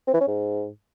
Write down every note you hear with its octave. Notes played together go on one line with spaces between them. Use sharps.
C4
E3
C#4
G#2